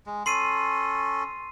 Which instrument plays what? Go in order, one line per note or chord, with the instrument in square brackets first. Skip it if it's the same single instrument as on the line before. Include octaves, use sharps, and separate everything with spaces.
[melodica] G#3
[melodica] C#4 A4 [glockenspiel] C6 C7 D#7